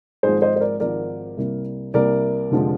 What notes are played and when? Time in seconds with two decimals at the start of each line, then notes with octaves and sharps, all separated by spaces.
0.23 G#1 G#2 F3 G#3 G#4 C5
0.42 C5 D#5
0.56 C5
0.61 A#4 D5
0.80 G#1 G#2 F3 G#3 A#4 D5
1.37 C2 C3 G3 A#3
1.94 C2 C3 G3 A#3 A#4 D5
2.51 F1 D3 F3 G#3